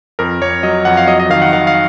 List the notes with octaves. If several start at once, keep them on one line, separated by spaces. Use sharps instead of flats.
F2 A#4
F2 C#5
F#3 D#5
F2 F#5
F5
F#3 D#5
D#5
D#3 F5
F#5
D#3 F5
F5